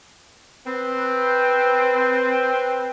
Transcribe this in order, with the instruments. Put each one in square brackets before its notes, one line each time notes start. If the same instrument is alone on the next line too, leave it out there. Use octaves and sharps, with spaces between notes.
[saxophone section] C4 B4